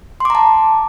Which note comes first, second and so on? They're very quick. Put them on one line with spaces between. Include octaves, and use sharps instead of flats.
C6 D6 A#5 A5